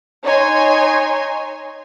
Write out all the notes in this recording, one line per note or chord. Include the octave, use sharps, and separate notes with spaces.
D#4 C#5 G#5 C6